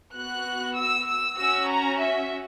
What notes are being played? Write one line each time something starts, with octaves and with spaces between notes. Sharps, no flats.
B3 F#4 F#6
E6
E6
C#4 F#4 E6
A#5
E5